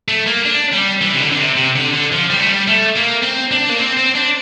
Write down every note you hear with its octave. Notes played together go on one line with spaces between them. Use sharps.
A3
A#3
D4
G3
E3
C3
D3
D3
C3
C3
D3
D3
F3
G3
A3
G3
A3
A#3
C4
D4
A#3
C4
C4
D4